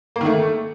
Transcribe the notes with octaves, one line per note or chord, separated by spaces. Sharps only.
A#3
D#3
A3